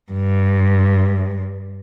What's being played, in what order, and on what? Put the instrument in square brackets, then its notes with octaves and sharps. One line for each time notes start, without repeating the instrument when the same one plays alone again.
[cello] G2